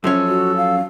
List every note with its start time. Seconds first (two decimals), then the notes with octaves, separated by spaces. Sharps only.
0.04 F#2 F3 C#4 A4
0.28 F#4
0.57 F5